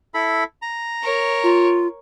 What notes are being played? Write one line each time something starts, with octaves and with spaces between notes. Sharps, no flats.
E4 A4 B5
A#5
A#4 C#5
F4